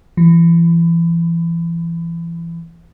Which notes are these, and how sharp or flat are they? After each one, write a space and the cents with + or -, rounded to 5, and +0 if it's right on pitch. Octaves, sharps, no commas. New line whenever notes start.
E3 +30